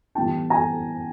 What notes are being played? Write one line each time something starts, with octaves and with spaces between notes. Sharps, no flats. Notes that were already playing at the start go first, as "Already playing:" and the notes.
A2 E3 G3 B3 D#4 G5 A5
G#5 A#5